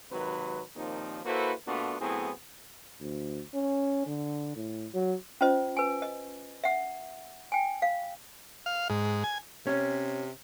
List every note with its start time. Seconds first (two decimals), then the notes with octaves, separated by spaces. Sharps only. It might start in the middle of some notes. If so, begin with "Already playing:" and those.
0.12 G#1 C3 D#3 F#3 B4
0.76 D#2 A#2 F3 C4 D#4
1.25 A#3 E4 F#4 A4 B4 C5
1.67 A#2 A3 B3 D4 F4 F#4
2.01 A2 F#3 B3 C4 E4 G#4
3.00 D2
3.55 C#4
4.07 D3
4.56 A2
4.94 F#3
5.41 C#4 F4 C5 D#5
5.77 B4 G#5
6.02 D#5
6.64 E5 F#5
7.52 G5 G#5
7.82 F5
8.66 F5
8.90 G#2
9.24 G#5
9.67 C3 C#4